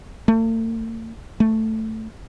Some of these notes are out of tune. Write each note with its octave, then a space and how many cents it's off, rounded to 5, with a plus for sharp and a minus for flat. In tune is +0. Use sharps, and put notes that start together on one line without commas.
A3 +45
A3 +5